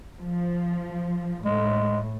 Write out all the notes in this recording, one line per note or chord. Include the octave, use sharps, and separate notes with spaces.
F3
A2 G#3